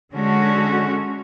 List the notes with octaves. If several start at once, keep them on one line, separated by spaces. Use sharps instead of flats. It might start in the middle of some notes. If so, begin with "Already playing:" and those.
D3 G#3 C#4 F#4